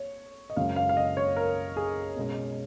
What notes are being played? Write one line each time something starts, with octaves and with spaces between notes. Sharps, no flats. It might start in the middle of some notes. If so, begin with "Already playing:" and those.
Already playing: C#5
D#5
F#2 C#3 G#3 F5
F5
F5
D#5
C#5
A#4
G#4
B2 G#3 C#4